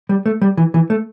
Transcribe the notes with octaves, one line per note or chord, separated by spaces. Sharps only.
G3
A3
G3
E3
E3
A3